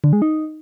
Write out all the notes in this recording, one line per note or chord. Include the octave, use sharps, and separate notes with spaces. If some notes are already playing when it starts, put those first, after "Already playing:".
D3
G#3
D#4